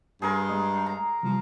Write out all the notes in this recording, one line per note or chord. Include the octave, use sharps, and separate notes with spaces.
G2 G#4 A#4 C6
G#3 D#5 D#6
A#5
C3 E3 F3 G3